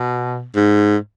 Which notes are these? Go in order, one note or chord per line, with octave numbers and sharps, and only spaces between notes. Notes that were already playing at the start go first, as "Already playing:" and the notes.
Already playing: B2
G#2